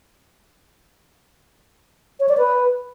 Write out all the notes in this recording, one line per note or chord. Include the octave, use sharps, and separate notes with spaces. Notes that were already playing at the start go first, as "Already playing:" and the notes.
C#5
D5
B4